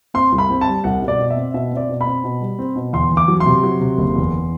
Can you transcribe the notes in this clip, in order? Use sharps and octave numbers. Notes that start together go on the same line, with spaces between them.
C4 C6
C2
B5
C4
A5
G3
C2 F#5
B2
D5
B2
E5
C4
B2 E5
C4
D5
B2
B5
C4
B2
G3
C4
B2
E2 C6
E2
D6
F#3
C6
C3
F#3
C3
F#1
E2